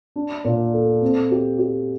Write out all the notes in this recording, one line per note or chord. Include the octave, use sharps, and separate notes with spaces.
D4
A#2
A4
C4
G4
G4